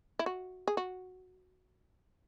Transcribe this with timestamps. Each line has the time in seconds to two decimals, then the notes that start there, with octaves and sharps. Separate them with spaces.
0.19 E4
0.26 F#4
0.67 G#4
0.77 F#4